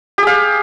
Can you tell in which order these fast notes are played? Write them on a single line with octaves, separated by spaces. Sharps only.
G4 G#4 F5